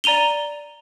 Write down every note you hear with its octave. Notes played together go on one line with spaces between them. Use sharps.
D5 A#5 D#7 F7 G7